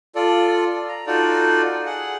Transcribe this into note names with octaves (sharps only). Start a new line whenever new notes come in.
F4 A4 D5
A#5
D#4 F4 F#4 A4 D5
G#4 F#5